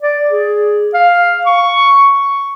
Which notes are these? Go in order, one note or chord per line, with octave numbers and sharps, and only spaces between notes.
D5
G#4
F5
C#6